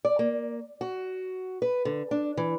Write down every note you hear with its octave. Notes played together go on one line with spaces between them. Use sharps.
D5
A#3
F#4
B4
D3
D4
E3